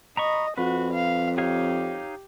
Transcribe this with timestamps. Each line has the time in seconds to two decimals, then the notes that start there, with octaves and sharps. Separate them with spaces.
0.17 D#5 A#5 B5 C#6
0.58 F2 F#4 B4
0.94 F5
1.38 D#4 G4 C#5 F5